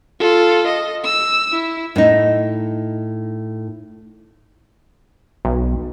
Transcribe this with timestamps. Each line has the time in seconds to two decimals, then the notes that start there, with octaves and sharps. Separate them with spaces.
0.20 F4 A4
0.67 D#5
1.04 E6
1.52 E4
1.96 A2 D#4
5.45 B1